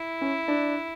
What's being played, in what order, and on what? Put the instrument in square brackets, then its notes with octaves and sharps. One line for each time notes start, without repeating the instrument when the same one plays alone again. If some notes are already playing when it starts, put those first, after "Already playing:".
Already playing: [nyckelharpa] E4
[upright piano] C#4
D4